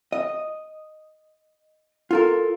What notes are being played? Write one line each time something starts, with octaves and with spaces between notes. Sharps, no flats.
D#5
F4 A4 A#4